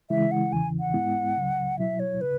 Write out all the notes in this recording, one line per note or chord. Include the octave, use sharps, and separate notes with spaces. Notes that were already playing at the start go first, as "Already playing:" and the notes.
C#3 E3 G#3 E4 E5
F#5
E2 C#3 E3 G#5
F#5
G#2 G#3 B3 E4
C#2 C#3 F#3
B2 F#3 E4 E5
C#5
C#3 B4